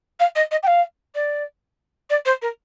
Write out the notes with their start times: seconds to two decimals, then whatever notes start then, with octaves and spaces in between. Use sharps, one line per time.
0.20 F5
0.35 D#5
0.51 D#5
0.63 G5
0.67 F5
1.14 D5
2.10 D5
2.25 C5
2.42 A#4